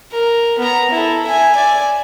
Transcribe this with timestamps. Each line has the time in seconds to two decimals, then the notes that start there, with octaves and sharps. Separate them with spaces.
0.11 A#4
0.58 B3 A#5
0.91 E4 A4
1.26 E5 G#5
1.55 D5 G#5